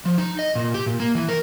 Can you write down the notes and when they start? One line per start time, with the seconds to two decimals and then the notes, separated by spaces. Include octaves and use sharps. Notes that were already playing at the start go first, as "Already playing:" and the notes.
0.06 F3
0.18 D#4
0.39 D#5
0.55 A#2
0.74 G4
0.86 A#2
1.00 A#3
1.15 E3
1.29 A#4